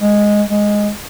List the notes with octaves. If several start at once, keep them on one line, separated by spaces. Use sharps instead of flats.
G#3
G#3